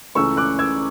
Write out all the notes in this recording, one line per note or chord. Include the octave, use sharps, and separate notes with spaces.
C#2 C#3 E3 A3 C#4 C#6 E6
D6 F#6
E6 G#6